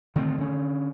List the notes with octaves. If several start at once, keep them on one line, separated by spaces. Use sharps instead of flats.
D3 D#3 A3 C4
D3 C#4